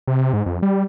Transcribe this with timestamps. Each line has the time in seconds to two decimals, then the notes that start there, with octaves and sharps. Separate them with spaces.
0.07 C3
0.33 G#2
0.46 F2
0.63 G3